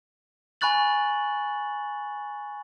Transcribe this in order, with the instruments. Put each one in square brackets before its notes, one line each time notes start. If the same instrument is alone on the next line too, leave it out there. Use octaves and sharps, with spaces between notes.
[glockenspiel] G#5 B5 C#6 F#6 A6 F#7